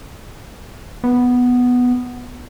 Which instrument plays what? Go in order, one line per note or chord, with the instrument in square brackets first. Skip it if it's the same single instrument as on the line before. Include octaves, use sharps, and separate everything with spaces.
[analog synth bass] B3